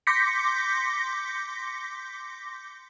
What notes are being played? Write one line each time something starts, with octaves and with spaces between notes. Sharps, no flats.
C6 D6 G6 A#6 B6 C#7